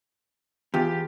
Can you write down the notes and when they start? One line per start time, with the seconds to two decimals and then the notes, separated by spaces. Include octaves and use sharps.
0.74 E2 F4 G4